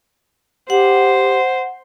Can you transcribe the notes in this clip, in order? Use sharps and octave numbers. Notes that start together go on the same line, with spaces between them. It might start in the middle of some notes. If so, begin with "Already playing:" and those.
G4 C5 F#5